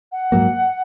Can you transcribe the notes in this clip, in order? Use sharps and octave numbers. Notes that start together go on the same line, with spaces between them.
F#5
G#2 F#3 A#3